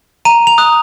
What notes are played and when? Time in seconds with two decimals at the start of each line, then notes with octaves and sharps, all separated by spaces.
0.25 A#5 D#7
0.47 F7
0.58 D#6 F#6